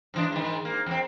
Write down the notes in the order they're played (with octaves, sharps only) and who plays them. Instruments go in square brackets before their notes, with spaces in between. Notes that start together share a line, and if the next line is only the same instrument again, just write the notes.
[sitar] G#2 E3 D4
G#2 D#3
A#3
E2 C4